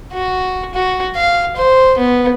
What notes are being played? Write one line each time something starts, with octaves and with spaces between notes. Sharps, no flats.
F#4
F#4
F5
C5
B3